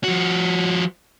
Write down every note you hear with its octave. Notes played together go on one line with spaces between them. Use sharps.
F3 F#4